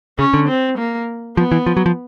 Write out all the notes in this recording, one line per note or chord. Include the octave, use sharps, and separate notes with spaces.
C#3 C#4
D3
C4
A#3
F3 B3
E3
F3
F#3
F3